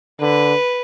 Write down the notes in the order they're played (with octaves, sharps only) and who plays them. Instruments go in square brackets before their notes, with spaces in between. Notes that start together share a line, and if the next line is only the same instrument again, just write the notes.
[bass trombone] D3 [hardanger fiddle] B4